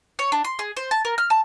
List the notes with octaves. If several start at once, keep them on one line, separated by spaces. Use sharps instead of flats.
C#5
D4
C6
G#4
C5
A5
A#4
F6
A5